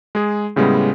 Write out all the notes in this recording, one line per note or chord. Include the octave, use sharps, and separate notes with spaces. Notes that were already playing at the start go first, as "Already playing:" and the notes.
G#3 G#4
A2 C#3 G3 G#3 B3